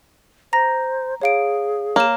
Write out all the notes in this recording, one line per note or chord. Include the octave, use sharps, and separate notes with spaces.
C5 A#5 A#6
G#4 C#5 F5 D7
A#3 C#5 E7